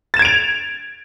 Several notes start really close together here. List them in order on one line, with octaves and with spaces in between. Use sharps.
A6 E7 G#6 D7 F7